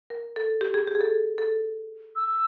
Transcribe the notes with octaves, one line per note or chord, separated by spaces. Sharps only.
A#4
A4
G4
G#4
G4
G#4
A4
A4
E6